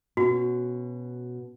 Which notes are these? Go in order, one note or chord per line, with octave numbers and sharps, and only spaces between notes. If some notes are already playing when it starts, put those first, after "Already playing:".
B2 C#4 F#4